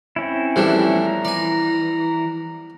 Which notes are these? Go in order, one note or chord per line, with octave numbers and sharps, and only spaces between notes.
C4 C#4 E4
E2 A2 E3 F3 G3 D4
A#5
E3 D5 G#5